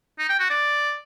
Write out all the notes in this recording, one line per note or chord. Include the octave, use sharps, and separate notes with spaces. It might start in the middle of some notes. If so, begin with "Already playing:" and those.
D#4
G5
F#4
D5